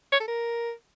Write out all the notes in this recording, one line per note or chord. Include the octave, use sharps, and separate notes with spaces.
C#5
A4
A#4